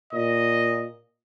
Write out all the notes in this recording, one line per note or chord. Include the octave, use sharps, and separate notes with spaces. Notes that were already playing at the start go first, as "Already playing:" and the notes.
A#2 D#5